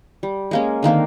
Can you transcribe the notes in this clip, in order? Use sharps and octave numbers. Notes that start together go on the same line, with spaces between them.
G3
G#3 A#3 C#4
D3 D#3 A#3 C4